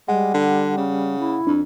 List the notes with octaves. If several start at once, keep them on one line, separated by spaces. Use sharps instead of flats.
G3 G#3 F#5
D3
C#3
E4
F2 D4